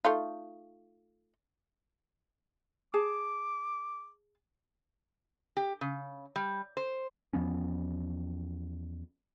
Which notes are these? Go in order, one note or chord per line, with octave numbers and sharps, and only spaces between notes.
A3 D#4 F4
G#4 A5 D6
G4
C#3
G3
C5
E2 F3 B3 C#4